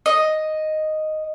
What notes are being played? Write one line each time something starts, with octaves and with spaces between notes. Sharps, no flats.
D#5